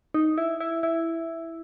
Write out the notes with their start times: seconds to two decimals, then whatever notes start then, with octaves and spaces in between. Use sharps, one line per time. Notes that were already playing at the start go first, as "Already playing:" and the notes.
0.14 D#4
0.38 E4
0.60 E4
0.83 E4